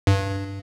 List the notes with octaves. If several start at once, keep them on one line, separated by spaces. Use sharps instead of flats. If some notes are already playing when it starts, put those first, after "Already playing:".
G2